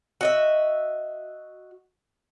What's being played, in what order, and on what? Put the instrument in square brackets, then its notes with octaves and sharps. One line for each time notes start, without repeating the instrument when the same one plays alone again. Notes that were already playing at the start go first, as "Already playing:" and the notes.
[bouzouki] F#4 D#5 E5